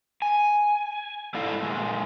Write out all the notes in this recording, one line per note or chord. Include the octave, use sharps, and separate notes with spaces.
G#5
G#2 E4 A4 D5 F5
A#2 C#3 G#3